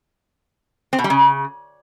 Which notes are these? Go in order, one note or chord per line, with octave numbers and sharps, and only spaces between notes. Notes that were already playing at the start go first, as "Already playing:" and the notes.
C4
B2
G3
C#3